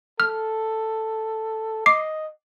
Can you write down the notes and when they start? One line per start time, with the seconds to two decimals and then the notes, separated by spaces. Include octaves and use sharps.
0.20 A4 F6
1.86 D#5 D6 C7